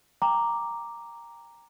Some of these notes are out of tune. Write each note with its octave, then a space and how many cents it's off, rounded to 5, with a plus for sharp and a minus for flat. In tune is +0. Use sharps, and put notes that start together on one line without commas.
G5 +20 A#5 +0 D6 +0